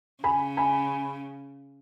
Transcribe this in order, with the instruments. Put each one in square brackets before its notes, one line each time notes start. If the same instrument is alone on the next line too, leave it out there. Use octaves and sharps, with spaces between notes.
[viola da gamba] C#3 [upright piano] G#5 B5
[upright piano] G#5 B5